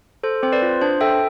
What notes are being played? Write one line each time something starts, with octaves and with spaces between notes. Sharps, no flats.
A4 C5
C4 C5
B4 D5
F4
D4 C5
A4 E5 G5